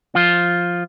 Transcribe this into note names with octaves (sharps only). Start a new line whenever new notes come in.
F3 F4